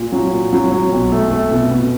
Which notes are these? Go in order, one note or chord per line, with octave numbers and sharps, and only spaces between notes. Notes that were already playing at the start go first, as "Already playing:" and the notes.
Already playing: A#2
F#3
A#2
F#3
F#3
B1
A3
A3
B2
B2